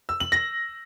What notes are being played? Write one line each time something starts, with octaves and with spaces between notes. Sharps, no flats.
E6
F#7
A#6